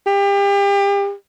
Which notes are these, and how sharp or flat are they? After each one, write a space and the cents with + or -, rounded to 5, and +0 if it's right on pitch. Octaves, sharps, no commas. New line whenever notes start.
G4 +35